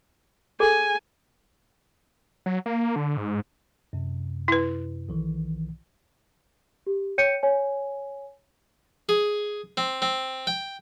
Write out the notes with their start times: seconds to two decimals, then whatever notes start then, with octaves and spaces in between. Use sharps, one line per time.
0.60 G#4 A4 G#5
2.46 F#3
2.66 A#3
2.96 D3
3.17 G#2
3.93 F#2 C3
4.48 E4 B4
5.09 B1 D#3 E3
6.87 G4
7.18 C#5 G5 G6 C#7 D#7
7.43 C#5 G#5
9.09 G#4
9.77 C4
10.02 C4
10.47 G5